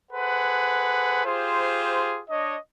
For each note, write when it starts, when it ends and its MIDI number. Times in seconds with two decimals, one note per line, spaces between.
0.11 1.25 68
0.11 1.25 69
0.11 1.25 71
0.11 1.25 72
0.11 1.25 78
1.25 2.22 65
1.25 2.22 67
1.25 2.22 68
1.25 2.22 72
2.30 2.56 62
2.30 2.56 73
2.30 2.56 75